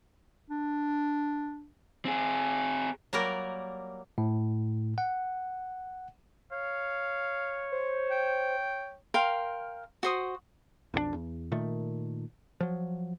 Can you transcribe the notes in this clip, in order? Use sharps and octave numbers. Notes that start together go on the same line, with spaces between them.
D4
C4 G#4
F#3 G3 A#3 A#4 D5
A2
F#5
C#5 F5
C5
G5
A#4 F5 G5 C6
F#4 C5 D#6
B1 F2 F3 D4
E2
A#2 D#3 A3
F3 F#3